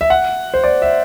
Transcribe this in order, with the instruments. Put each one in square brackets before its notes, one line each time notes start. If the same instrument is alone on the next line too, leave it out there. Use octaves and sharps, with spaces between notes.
[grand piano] E5
F#5
C5
D5
E5